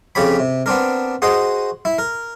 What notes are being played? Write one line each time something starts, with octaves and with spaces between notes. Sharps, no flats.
F2 C#3 G4 C#5 B5
C3
B3 C4 D4 A#4
F#4 G#4 C5 D#5 C6
E4
A#4